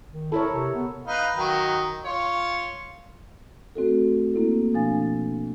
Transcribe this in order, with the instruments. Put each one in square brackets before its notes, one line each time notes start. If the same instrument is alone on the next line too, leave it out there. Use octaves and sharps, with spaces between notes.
[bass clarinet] D#3
[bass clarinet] E4 [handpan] A4 A#4 C#5
[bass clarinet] C3
B3
[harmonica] D#4 B4 F5
D#3 F#3
F4 C#5
[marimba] A3 C4 F#4 A4
A#3 C4 E4 A4
B2 F3 D4 F5 G#5 A6